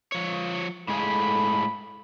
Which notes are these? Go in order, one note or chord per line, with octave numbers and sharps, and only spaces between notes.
F3 C#5
A2 G#3 G#4 A4 F5 B5